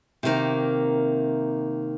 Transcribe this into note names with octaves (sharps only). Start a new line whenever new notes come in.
C3 D#3 A#3